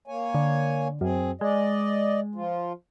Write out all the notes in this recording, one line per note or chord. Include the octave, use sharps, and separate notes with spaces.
A#3 C#5 G#5
D3
F#2 C4 G#4
G#3 D5 D#5
F3 F4